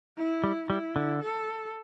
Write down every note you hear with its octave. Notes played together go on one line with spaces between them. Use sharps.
E4
G3
G3 E4
D3
A4